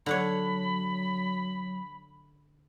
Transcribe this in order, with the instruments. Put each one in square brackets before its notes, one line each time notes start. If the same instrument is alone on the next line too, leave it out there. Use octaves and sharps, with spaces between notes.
[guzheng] D3 D4 C#5 [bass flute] F#3 [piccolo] B5